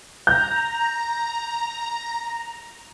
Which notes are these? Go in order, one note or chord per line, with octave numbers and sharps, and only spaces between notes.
A#5 G6